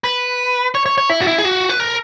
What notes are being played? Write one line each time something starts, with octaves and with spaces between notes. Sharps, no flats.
B4
C#5
C#5
C#5
E4
F#4
E4
G#4
F#4
B4
A#4